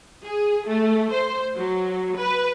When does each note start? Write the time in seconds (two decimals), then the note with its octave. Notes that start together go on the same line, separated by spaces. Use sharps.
0.24 G#4
0.67 A3
1.12 C5
1.57 F#3
2.17 B4